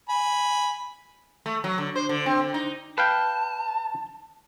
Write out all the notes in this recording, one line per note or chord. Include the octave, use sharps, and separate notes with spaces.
G#5 B5
A3
F#3
D3
C5
D3
C4
D3
D#4
B4 F5 G5 A5